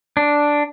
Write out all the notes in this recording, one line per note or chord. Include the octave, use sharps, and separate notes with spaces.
D4